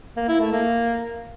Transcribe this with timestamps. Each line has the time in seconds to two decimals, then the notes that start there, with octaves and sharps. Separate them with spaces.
0.17 A#3
0.28 E4
0.40 A3
0.52 A#3